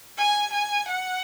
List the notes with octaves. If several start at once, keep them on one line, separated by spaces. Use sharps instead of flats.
G#5
G#5
F#5